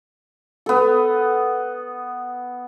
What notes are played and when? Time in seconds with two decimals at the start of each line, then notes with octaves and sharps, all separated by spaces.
0.66 B3 A4